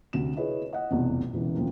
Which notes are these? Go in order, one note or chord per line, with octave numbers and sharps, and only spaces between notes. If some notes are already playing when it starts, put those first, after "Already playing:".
D2 C3 F#4 E7
E4 G#4 B4 C#5 D#5
D#5 F#5
F1 B1 E2 C3
E1 B1 C#3 E3
D#2 C#3 F3 C4